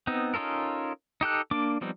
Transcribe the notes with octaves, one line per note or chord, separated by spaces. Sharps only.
B3 C4 D#4
C#4 D#4 F4 A4 A#4
D#4 G4 A4 F#6
A#3 D4 D6
F3 G3 B3 C4 D#4